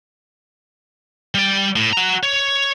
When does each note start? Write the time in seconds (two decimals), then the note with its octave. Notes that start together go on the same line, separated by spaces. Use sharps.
1.34 G3 D5
1.76 A2
1.93 F#4 A#5
2.23 C#5